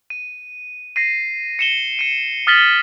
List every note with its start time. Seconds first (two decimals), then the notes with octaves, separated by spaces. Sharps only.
0.10 D#7
0.96 A#6 C7 D#7
1.59 C#7 E7 G7
1.99 C#7 D#7
2.47 D#6 F6 A6 B6 F#7 G7